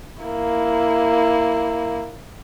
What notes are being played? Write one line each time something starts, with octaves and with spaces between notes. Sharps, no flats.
A#3 E4